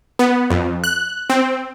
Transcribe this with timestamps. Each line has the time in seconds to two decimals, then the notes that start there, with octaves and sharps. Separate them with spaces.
0.19 B3
0.50 F2
0.84 F#6
1.30 C4